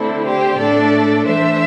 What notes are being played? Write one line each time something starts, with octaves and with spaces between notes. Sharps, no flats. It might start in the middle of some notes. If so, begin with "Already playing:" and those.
Already playing: D3 A3 C4 E4 A4
G4 C5
A2 A3 D4 A4 D5
E3 A3 D4 C5 E5